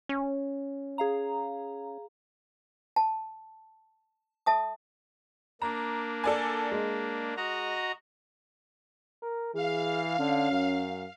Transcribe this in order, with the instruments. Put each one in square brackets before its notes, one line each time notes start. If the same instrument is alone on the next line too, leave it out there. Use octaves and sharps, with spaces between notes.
[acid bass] C#4
[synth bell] G#4 F5 A#5
[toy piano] A5
A4 E5 A5 D#6
[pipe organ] A#3 D4 [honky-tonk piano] A#5
[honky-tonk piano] A4 D5 G#5
G#3
[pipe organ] F#4 D#5 A#5
[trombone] A#4
[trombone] E3 [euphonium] G#4 [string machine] F5
[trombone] D3 [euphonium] C#4
[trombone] F#2